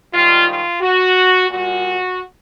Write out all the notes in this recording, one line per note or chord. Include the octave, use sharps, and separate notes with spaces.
G#2 D#3 G3 F4
F4
F#4
A#2 G3 F#4